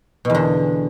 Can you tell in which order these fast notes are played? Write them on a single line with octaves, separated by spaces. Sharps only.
B2 E2 D3